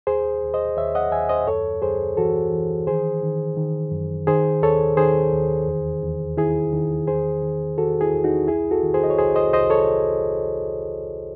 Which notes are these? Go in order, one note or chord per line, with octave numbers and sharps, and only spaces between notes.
D#2 G#4 C5
D#2
C5 D#5
D#2 C#5 E5
D#5 F#5
D#2 E5 G#5
C5 D#5
F#2 A4 C#5
F#2 G#4 C5
E3 F#4 A4
E3
D#3 G#4 C5
D#3
D#3
F#2
D#3 G#4 C5
D#2 A4 C#5
D#3 G#4 C5
D#2
E2
E2
D#3 E4 G#4
D#3
E2 G#4 C5
D#3
D#3 F#4 A4
E4 G#4
E2
D#4 F#4
C2 E4 G#4
F#4 A4
D#3
G#4 C5
D#5
C#5
C2 G#4 C5
C5 D#5
C2 C5 D#5
A4 C#5